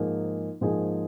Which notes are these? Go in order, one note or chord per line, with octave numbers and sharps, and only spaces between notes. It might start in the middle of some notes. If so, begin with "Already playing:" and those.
Already playing: G#2 F3 A#3 D#4 G#4
G#2 F3 A#3 D#4 G#4